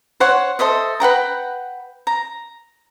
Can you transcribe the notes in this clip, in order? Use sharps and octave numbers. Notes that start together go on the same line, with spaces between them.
C5 C#5 F#5
A4 C5 D#5 E5
B4 F#5 G5 A#5
A#5